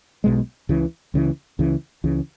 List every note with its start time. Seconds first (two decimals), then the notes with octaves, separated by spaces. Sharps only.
0.24 B1 B2 G#3
0.69 C#2 C#3 E3
1.14 C#2 C#3 E3
1.59 C#2 C#3 E3
2.04 C#2 C#3 E3